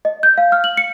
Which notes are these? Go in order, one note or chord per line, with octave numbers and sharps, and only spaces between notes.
D#5
G6
F5
F6
F#7
C#7